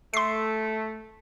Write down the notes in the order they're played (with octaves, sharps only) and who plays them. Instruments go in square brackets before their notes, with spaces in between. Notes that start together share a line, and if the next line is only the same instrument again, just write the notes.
[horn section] A3 [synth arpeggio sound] C6 C7